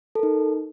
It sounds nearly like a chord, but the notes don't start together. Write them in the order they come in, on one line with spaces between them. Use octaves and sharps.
A4 A#4 D#4